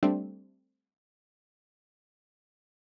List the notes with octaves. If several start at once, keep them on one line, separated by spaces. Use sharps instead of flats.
G3 A3 C4 D4